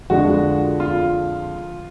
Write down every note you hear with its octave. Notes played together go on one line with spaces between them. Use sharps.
F2 D3 F3 G#3 F#4
F4